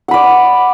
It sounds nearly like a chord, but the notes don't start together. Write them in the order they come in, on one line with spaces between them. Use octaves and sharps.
F#5 B5 D5